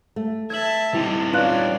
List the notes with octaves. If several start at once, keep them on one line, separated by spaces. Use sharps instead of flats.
A3
E5 A5 G#6 F#7
G3 C4 D#4 E4
C#4 F4 B4 D5 F#6